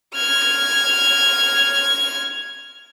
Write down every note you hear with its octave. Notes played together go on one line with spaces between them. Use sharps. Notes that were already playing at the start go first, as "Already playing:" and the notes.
F6 G#6